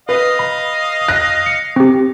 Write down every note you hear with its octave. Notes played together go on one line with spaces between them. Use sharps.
B4 D#5 F5
B5
F#6 A#6
C#7
C4 G4